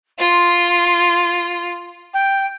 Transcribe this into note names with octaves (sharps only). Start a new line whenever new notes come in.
F4 C6
G5